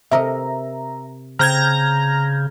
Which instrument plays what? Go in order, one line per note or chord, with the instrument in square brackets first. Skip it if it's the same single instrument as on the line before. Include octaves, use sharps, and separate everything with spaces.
[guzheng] C3 A#4 D#5 [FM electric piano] E5 A#5
[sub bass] C#3 [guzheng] C4 [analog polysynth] A#5 [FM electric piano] F6 G6 G#6